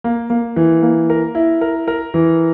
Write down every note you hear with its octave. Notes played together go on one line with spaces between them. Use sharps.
A#3
A#3
E3
A#3
A#4
E4
A#4
A#4
E3